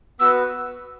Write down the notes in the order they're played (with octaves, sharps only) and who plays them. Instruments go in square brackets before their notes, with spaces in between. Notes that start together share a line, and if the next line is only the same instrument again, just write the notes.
[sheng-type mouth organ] B3 F#4 B4 [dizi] E6